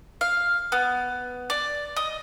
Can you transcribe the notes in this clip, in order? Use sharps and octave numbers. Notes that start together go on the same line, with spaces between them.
F5
B3
D5
D#5